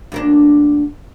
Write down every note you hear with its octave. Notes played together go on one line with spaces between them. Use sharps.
D2 A#3 D4